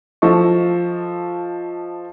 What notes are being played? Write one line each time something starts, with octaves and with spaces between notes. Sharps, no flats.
F3 A4 D#5 C#6